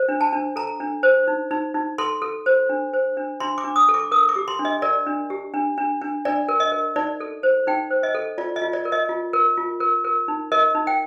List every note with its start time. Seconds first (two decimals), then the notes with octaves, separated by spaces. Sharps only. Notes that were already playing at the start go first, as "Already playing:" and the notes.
Already playing: C5
0.08 D4
0.21 A5
0.33 D4
0.56 A4 A#5
0.80 D4
1.03 C5
1.28 D#4
1.51 D#4
1.74 D#4
1.98 A4 C6
2.22 A4
2.46 C5
2.69 D4
2.93 C5
3.17 D4
3.40 D4 C6
3.58 D6
3.64 D4
3.76 D#6
3.89 A4
3.94 D6
4.11 A#4 D#6
4.29 D6
4.36 G4
4.48 C6
4.59 D4
4.65 D#5
4.82 A#4 D5
5.06 D4
5.30 G4
5.54 D4
5.78 D4
6.02 D4
6.25 D4 D5
6.49 A#4
6.60 D#5
6.72 A#4
6.96 D#4 D5
7.20 A4
7.43 C5
7.67 D#4 G5
7.90 C5
8.03 D#5
8.14 A4
8.38 F4 D5
8.56 D#5
8.62 F4
8.73 D5
8.85 A#4
8.92 D#5
9.09 F4
9.33 A#4
9.57 F4
9.80 A#4
10.05 A#4
10.28 D#4
10.52 A#4 D#5
10.75 D#4
10.87 G5